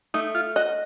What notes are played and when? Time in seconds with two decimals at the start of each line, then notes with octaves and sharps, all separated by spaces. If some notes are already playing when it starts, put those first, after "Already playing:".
0.14 A3 D#4
0.35 F4
0.56 F#4 D#5